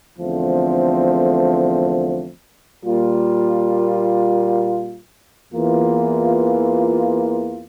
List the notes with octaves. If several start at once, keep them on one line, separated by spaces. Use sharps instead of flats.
E2 D3 F3 A3 C4
A#2 G3 A#3 F4
E2 E3 A#3 F4